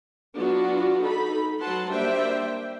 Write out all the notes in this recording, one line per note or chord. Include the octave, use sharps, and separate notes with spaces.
F#3 B3 D4 F4 F#4
D#4 A4 B5
F#3 F#4 B4 F#5 A5 C6
G3 A#3 D4 C5 E5 G5